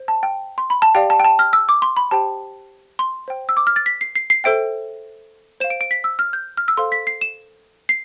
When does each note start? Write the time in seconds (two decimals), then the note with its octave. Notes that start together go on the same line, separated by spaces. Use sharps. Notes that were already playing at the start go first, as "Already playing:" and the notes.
Already playing: C5
0.08 A5
0.23 G5
0.58 C6
0.70 B5
0.82 A5
0.95 G4 D5 F5 G5
1.10 A5
1.20 G5
1.24 A5
1.39 F6
1.53 E6
1.69 D6
1.82 C6
1.97 B5
2.11 G4 C5 G5 A5
2.99 C6
3.28 C5 G5
3.49 E6
3.57 D6
3.67 F6
3.76 A6
3.86 B6
4.01 C7
4.16 C7
4.30 C7
4.44 A4 C5 E5 G5 D7
5.60 C5 F5 E7
5.70 D7
5.81 D7
5.91 B6
6.04 E6
6.19 F6
6.33 G6
6.57 F6
6.68 E6
6.77 A4 C5 F5 C6
6.92 B6
7.07 C7
7.21 E7
7.89 C7